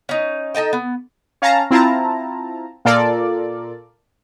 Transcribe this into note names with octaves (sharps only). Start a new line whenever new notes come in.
C#4 D#4
D#4 A4 D#5 G5
B3
C#4 F5 A5 A#5
C4 E4 F4 A5 A#5
A#2 F4 A4 A#4 D5